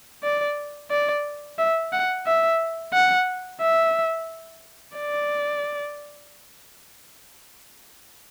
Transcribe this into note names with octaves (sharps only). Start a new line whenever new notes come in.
D5
D5
E5
F#5
E5
F#5
E5
D5